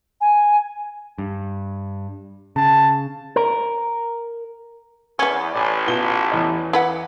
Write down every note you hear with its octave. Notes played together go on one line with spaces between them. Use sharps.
G#5
G2
C#3 A5
A#4
E2 B3 C#4
A1 D5 G#5
B2 F4 G7
E2 E3 D#5
E4 B4 F#5